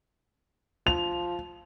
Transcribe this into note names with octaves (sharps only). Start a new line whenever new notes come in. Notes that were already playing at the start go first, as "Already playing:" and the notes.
F3 F7